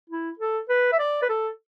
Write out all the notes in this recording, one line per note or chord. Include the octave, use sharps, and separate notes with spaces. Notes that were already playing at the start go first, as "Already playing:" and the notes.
E4
A4
B4
E5
D5
B4
A4